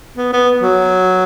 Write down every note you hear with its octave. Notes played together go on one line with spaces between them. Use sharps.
B3
B3
F#3